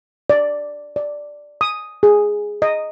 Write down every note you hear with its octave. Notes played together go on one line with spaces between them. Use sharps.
D5
D5
D#6
G#4
D#5